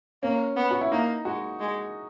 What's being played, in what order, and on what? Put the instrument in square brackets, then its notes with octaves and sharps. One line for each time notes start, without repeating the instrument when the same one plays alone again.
[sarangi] A#3 [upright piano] C#4
[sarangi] B3
[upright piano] F#4
E4
[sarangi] A#3 [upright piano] D#4
[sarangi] G#3 [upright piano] F#4
[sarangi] G#3